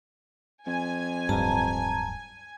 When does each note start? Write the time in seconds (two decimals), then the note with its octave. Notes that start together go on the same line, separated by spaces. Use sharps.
0.67 F2 G#5
1.29 D1 G2 A5 A#5